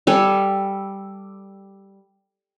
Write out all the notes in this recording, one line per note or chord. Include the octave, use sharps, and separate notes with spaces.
G3 A4 G#5